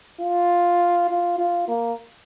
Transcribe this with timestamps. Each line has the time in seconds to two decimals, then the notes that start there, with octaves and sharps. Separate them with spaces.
0.21 F4
1.10 F4
1.38 F4
1.68 A#3